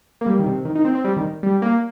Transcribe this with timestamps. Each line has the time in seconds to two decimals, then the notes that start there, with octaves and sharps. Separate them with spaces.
0.21 A#3
0.26 G3
0.39 D#3
0.46 C3
0.65 D#3
0.75 D#4
0.85 C4
0.95 C4
1.04 G3
1.17 D#3
1.43 G3
1.62 A#3